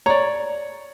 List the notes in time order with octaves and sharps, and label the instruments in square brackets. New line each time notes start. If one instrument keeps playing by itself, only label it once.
[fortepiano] C#5 [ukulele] D5 A#5